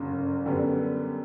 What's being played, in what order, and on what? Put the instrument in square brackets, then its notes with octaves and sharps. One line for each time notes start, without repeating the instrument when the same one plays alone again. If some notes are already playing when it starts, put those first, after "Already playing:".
Already playing: [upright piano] G1 F#2 C#3
F#2 D3 G3 B3